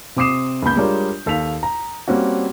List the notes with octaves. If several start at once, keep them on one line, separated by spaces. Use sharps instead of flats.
C3 C4 D6 D#6 C7 E7
C#2 A#3 B3 B5 G6
G3 G#3 D4 F4 A#4 C#5
D#2 A4 F5 B6 F7
A#5
G3 A#3 C4 C#4 F#4